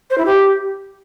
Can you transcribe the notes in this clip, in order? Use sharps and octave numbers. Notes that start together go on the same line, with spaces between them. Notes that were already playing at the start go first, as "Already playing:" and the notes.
C5
E4
G4